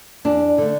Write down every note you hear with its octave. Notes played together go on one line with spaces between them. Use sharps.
E2 D4
D3 A3